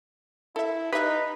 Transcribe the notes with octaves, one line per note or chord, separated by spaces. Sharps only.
E4 A4 E5
D#4 G4 B4 D#5 E5